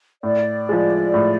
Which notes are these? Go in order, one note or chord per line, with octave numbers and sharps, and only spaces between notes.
A2 D5
F3 G#3
A2